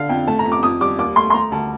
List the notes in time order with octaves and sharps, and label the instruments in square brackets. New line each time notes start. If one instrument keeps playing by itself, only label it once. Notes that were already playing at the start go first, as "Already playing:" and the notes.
Already playing: [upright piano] D3 F5
F2 G5
A3 A5
A#5
F2
D6
F2 D#6
G3 D6
D#2 D6
A3 C6
C6
A3 A#5
D2 A5